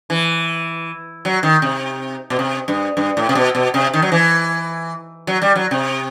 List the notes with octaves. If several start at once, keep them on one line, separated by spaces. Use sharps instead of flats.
E3
F#3
D#3
C3
B2
C3
G2
G2
A2
C3
B2
B2
C3
D#3
F#3
E3
F#3
G3
F#3
C3